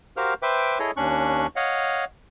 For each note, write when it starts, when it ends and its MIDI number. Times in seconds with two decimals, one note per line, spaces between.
0.17 0.34 66
0.17 0.34 67
0.17 0.34 70
0.17 0.34 72
0.17 0.34 77
0.17 0.34 89
0.42 0.79 71
0.42 0.79 72
0.42 0.79 76
0.42 0.79 79
0.42 0.79 86
0.79 0.91 64
0.79 0.91 68
0.79 0.91 69
0.79 0.91 73
0.79 0.91 75
0.97 1.47 39
0.97 1.47 61
0.97 1.47 62
0.97 1.47 85
0.97 1.47 90
1.56 2.05 73
1.56 2.05 75
1.56 2.05 77
1.56 2.05 78